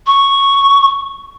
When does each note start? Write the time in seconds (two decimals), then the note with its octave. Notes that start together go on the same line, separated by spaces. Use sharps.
0.07 C#6